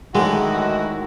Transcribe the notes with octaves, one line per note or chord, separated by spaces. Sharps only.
A2 D3 D#3 G#3 D#4 E4 F#4